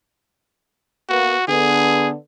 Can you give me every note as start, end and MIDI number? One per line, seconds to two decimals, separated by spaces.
1.09 1.33 58
1.09 1.33 59
1.09 1.45 66
1.48 2.12 50
1.48 2.12 59
1.48 2.09 68